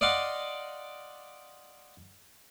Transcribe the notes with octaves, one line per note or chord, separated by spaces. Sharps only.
D5 D#5 F5 F#5 C6 D6